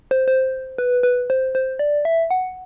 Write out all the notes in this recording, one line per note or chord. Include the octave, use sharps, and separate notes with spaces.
C5
C5
B4
B4
C5
C5
D5
E5
F#5